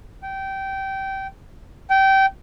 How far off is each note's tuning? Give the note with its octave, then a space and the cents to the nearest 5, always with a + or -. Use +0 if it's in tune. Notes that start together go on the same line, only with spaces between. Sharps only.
G5 -20
G5 -20